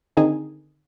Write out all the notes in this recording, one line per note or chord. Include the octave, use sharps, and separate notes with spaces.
D3 D#3 C4 D#4 G#4